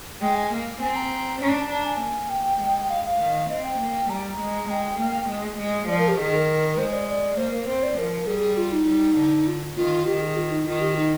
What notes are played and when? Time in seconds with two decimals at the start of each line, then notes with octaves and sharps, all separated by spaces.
0.21 G#3 G5
0.35 G#5
0.51 A#3
0.80 C4 G#5
0.96 A#5
1.41 D4
1.70 D4 A#5
1.85 G#5
2.00 A#3
2.30 G5
2.60 G#3
2.90 F5
3.05 F5
3.20 D#3
3.49 C4 D#5
3.65 G5
3.79 A#3
4.10 G3 A#5
4.24 A#5
4.39 G#3
4.69 G#3 G5
4.99 A#3
5.29 G#3
5.59 G#3
5.88 F3 D5
5.98 A#4
6.08 G4
6.19 D#3 G#4
6.34 A#4
6.78 G#3 C5
6.93 D5
7.08 D5
7.38 A#3 C5
7.52 A#4
7.68 C4 C5
7.83 D5
7.98 F3 A#4
8.27 G3 G#4
8.57 F4
8.73 D#4
8.87 G3
9.17 D3
9.47 F4
9.77 D#3 F4
10.06 D#3 G4
10.21 G#4
10.36 F4
10.51 D#4
10.66 D#3 F4
10.81 G4
10.96 D#4